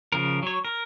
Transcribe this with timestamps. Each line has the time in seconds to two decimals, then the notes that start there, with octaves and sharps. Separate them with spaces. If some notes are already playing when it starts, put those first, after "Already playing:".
0.12 C#3 F3 A#4
0.43 F#3 C#5
0.65 A#4